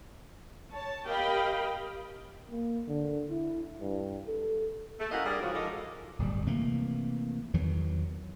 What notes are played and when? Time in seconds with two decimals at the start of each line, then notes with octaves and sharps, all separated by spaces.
0.72 C#5 A5
1.06 G4 A#4 D#5 F5 G5 B5
2.51 A#3
2.88 D3
3.30 E4
3.81 G2
4.27 A4
4.99 A3
5.11 C#4 E4 A#4 D#5 F5 F#5
5.25 G2 G3 G#4 A#4 D5
5.40 G#2 C#3 F3 F#3 F4 F#4
5.53 G#2 F3 G4 A4 A#4 D#5
6.19 D1 G1 G3
6.46 C3 E3 A3 A#3
7.54 E2 D#3 E3 F#3